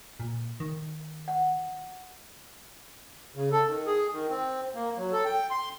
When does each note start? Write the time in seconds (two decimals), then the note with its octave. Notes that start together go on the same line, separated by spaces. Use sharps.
0.20 A#2
0.60 D#3
1.28 F#5
3.35 C#3
3.52 A4
3.67 D#3
3.86 G#4
4.12 D#3
4.30 C4
4.75 A#3
4.97 F#3
5.12 A4
5.25 G5
5.51 C6